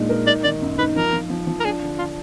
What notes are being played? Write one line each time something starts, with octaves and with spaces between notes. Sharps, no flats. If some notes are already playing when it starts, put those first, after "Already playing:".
Already playing: A#2 G#3 D4 D#4
A#4
D#4 D5
D#3 D5
F#2
D#4 B4
F3 A#4
F3
F3
F3
A#4
D4 G#4
D3
D4 F4